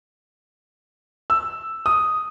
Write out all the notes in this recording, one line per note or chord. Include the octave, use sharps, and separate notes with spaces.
E6
D#6